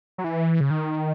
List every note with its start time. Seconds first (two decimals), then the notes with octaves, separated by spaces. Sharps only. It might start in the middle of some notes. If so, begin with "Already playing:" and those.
0.18 F#3
0.24 E3
0.61 C#3
0.70 D#3